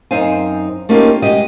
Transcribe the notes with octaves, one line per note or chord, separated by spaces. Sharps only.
F#2 C4 D#4 C5 F5 G#5
A3 A#3 C#4 D#4 F4 G4
G#3 F#4 G4 D#5